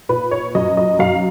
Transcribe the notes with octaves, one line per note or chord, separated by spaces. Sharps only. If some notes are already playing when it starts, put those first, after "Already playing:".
A#2 B4
C#5
F#2 D#5
D#5
F#2 F5